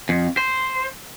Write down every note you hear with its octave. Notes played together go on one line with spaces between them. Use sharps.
F2
C5